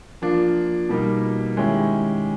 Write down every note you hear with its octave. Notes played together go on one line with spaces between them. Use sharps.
F3 A#3 D4 F4
B2 G3 A#3 D#4
D#3 G#3 C#4 E4 G4